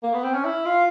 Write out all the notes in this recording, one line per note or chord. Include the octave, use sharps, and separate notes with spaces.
A#3
B3
C4
C#4
E4
F4